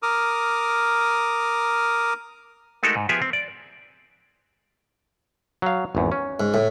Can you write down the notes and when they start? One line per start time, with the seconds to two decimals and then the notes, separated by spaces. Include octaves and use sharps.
0.03 A#4 D6 D#6 F6
2.83 G#3 A3 D#4 F#4 A4 A#4
2.96 G#2
3.09 F3 B3 G4 G#4 E5 G#5
3.22 C4
3.33 D5
5.62 F#3 F5
5.95 G#1 E2
6.12 C#4
6.40 G#2
6.54 A2